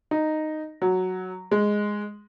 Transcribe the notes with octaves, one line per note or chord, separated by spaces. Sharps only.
D#4
F#3
G#3